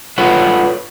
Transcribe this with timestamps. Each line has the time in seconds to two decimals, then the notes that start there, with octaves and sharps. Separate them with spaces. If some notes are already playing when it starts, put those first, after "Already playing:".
0.18 F4 A4 B4 C#5 F#5